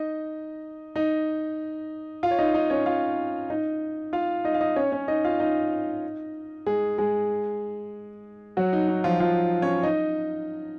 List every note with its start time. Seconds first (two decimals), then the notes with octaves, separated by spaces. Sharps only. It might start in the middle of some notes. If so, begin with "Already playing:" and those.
Already playing: D#4 D#5
0.96 D#4 D#5
2.23 F4 F5
2.31 C#5
2.38 D#4 D#5
2.54 D#4 D#5
2.70 C#4 C#5
2.86 F4 F5
3.50 D#4 D#5
4.13 F4 F5
4.45 D#4 D#5
4.54 F5
4.61 D#4 D#5
4.76 C#4 C#5
4.92 C#4 C#5
5.08 D#4 D#5
5.25 F4 F5
5.40 D#4 D#5
6.66 G#3 G#4
6.98 G#3 G#4
8.57 F#3 F#4
8.73 D#4
8.88 D#4
9.04 F3 F4
9.20 F3 F4
9.62 C#4 C#5
9.83 D#4 D#5